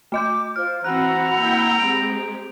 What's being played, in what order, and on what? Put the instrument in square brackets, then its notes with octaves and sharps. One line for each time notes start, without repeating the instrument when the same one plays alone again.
[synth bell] A3 D#5 G6 [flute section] D6
[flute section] F4 C5 [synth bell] F6
[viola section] E3 C4 F#4 [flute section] F#5 B5 E6 [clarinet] A#5 [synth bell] F#6
[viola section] A#3 E4 G5
[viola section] G#3 C4 G4 [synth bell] D7 F7